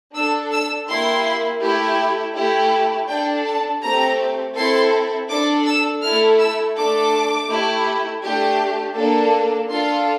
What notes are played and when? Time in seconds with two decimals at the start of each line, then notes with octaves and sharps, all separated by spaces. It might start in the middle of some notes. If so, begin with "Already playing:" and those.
0.16 D4 A4 E6
0.52 E6
0.88 A#3 E4 G4 C6
1.62 A3 E4 G4
2.36 A3 E4 G4
3.09 D4 A4 G5
3.46 A5
3.83 A3 C4 G4 A#5
4.56 C4 E4 A4 C6
5.29 D4 A4 D6
5.66 E6
6.03 A3 E4 A4 F6
6.40 E6
6.77 A3 D4 A4 D6
7.50 A3 E4 G4
8.23 A3 D4 G4
8.97 A#3 D4 A4
9.70 D4 F4 A4 C6